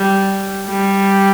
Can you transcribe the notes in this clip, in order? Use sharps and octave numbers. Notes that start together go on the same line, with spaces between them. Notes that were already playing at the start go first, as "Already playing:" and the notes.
Already playing: G3
G3